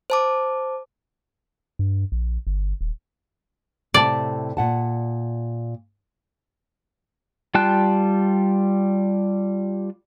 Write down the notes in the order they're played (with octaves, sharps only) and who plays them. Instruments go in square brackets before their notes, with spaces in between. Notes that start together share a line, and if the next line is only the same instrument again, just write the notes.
[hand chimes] C5 A5 D6
[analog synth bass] G2
A#1
G1
D#1
[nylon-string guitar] A2 C3 A5 [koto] D5
[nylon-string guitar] A#2 F#5 A5
[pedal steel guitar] G3 F4 G5 A5 F#6